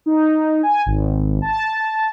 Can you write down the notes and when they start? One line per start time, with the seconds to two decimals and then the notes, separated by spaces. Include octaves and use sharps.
0.06 D#4
0.63 G#5
0.86 G#1
1.42 A5